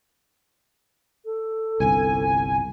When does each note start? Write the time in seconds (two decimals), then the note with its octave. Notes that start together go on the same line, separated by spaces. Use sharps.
1.25 A4
1.80 G1 C2 G#5